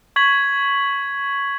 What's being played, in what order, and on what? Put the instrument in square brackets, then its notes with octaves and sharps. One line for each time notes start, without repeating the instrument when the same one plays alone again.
[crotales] C#6 G#6 B6 F#7